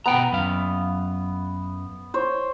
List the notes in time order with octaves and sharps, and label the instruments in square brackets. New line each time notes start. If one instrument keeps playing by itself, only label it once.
[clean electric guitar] B2 G5 A#5 [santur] B3
[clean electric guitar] F#2 F5
[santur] C5 C#5